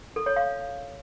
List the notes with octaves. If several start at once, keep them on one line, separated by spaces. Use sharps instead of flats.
A4
C#5
F5